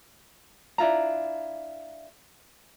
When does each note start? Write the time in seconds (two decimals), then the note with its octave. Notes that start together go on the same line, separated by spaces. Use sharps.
0.78 D4 E4 F4 A#5